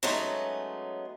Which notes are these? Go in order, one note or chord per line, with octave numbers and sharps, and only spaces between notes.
F#3 G#3 A3 B3 C#4 D#4